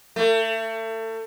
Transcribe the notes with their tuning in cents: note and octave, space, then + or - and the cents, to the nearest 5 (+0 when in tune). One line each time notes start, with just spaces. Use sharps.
A3 +30